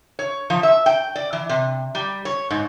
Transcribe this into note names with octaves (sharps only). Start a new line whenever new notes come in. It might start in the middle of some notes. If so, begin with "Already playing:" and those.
C#5
F3
E5
G5
D5
E3
C3
G3
C#5
G#2